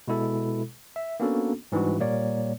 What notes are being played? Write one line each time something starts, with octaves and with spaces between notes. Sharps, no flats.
B2 G#3 E4 A4
E5
A#3 B3 C#4 D4 F#4 A4
G#2 E3 G3 D4 F#4
A#2 G3 A#3 C#5 D5